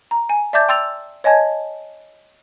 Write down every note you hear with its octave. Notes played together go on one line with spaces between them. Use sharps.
A#5
G#5
D5 E5 A5 D6 G6 A6
G5 C6 E6 A6 F7
C#5 D#5 G#5 A5 G#6